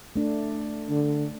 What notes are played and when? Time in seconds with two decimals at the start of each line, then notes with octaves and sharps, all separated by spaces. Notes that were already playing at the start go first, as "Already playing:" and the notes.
0.16 A3 D4
0.90 D3